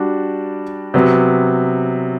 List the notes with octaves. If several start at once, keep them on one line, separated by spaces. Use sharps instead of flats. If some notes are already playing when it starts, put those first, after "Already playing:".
Already playing: G3 D4 F#4
C3 F#3 B3